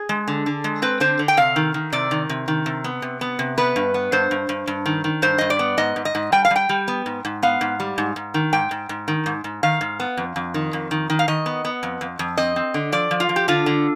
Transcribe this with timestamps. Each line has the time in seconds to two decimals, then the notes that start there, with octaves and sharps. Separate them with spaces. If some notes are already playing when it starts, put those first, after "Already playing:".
Already playing: G#4
0.09 G#3
0.28 D3
0.46 D3
0.64 G#3
0.82 C4 B4
1.00 D3 C5
1.19 D3
1.28 G5
1.37 C3 F5
1.56 D#3
1.74 D#3
1.93 C3 D5
2.11 D#3
2.30 C3
2.48 D#3
2.66 C3
2.84 B3
3.02 C3
3.21 B3
3.39 C3
3.58 B3 B4
3.76 G2
3.94 B3
4.12 G2 C5
4.31 G2
4.49 G2
4.67 G2
4.86 D#3
5.04 D#3
5.22 G2 C5
5.38 G2 D#5
5.50 D5
5.59 B3
5.78 G#2 D#5
5.96 G#2
6.05 D#5
6.15 G#2
6.32 G3 G5
6.45 F5
6.51 G3
6.56 G5
6.69 G3
6.88 B3
7.06 G#2
7.25 G#2
7.43 B3 F5
7.61 G#2
7.80 G3
7.98 G#2
8.16 G#2
8.34 D#3
8.53 G#2 G5
8.71 G#2
8.89 G#2
9.08 D#3
9.26 G#2
9.44 G#2
9.63 D#3 F5
9.81 G#2
10.00 B3
10.17 F2
10.36 F2
10.54 D#3
10.73 F2
10.91 D#3
11.10 D#3
11.19 F5
11.28 D#3 D#5
11.46 B3
11.65 B3
11.83 F2
12.01 F2
12.19 F2
12.37 C4 D#5
12.56 C4
12.74 D3
12.92 F3 D5
13.11 F3
13.20 F4
13.29 F3
13.36 G4
13.48 D3 F4
13.66 D3